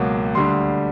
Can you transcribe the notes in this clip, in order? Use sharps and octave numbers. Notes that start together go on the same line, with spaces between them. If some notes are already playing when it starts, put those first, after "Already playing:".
Already playing: C#2 B2 F#3 A#3
D2 D3 G3 C6